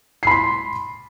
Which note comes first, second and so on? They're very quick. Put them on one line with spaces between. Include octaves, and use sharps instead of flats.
C7 B5 C6